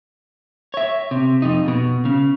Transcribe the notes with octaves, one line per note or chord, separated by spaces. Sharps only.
C#5 E5
C3
F2 D#4
B2
C#3